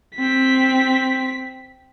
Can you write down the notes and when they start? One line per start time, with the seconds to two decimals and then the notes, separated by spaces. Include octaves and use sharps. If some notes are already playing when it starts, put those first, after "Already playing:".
0.16 C4 B6